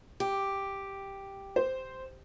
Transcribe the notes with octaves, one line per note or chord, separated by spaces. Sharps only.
G4
C5